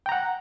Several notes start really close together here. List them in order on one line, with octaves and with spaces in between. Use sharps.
G5 A#5 F#5